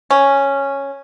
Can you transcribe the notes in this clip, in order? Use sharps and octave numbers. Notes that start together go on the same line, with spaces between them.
C#4